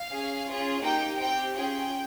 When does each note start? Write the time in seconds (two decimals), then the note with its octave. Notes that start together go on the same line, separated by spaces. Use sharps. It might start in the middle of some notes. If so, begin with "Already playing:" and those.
Already playing: F5
0.11 C#4 G#4
0.48 C#4 F4 G#4
0.83 A#3 D#4 G4 G5
1.20 C4 G4 G5
1.56 C#4 F4 G#4 G5